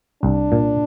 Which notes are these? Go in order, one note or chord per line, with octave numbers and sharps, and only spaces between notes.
C2 D4
A#2